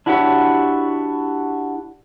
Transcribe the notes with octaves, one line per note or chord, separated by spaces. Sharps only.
D4 E4 F#4 G4 A4 C#5